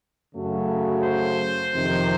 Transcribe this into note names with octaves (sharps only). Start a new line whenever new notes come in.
F#2 C#3 F#3 A3
C5
F2 C3 D#3